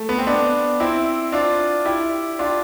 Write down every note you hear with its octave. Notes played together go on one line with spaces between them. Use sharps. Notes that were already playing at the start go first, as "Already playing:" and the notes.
Already playing: A3
B3
C4
B3 D4
C4 E4
D4 F4
E4 G4
D4 F4